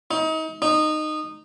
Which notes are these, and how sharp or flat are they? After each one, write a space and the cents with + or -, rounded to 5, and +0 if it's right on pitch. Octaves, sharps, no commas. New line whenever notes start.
D#4 +35
D#4 -15